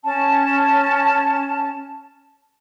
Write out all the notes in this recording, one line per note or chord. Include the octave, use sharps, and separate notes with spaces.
C#4 A5